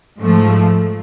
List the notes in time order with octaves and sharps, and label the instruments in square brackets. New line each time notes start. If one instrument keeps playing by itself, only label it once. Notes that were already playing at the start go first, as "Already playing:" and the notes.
[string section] G#2 F3 A3